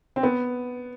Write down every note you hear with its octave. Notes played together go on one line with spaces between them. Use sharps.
C4
B3